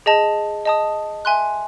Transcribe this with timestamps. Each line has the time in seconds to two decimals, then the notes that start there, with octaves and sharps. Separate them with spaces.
0.06 G#4 D#5 A5
0.65 D#5 A5 D#6
1.25 E5 G#5 C6 F#6